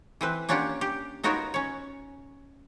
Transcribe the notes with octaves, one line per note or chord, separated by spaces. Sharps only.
E3 C4 B4
A#3 C#4 D4 F4 G4 F#5
G4
B3 D#4 F4 F#4 A#4 C#5
C#4 C#5